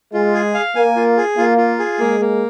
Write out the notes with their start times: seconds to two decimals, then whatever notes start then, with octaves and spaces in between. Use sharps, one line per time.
0.12 G#3 F4
0.34 G#4
0.54 F5
0.76 A#3 G#5
0.96 F4
1.17 G#4
1.37 A#3 F4
1.58 F4
1.79 G#4
2.00 G#3 A#3
2.20 A#3